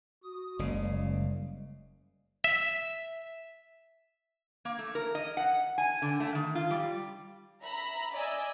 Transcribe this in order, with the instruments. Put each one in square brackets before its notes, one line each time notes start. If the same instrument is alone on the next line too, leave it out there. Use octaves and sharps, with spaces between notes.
[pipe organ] F#4 D#6
[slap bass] F#1 C#3 [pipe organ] G3 G#3 A#3
[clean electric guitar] E5
[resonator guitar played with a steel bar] A#3
A3
A#4
D#5
F#5
G#5
D3
A3
D#3
F4
G3
[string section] E5 A#5 B5
D5 D#5 G#5 E6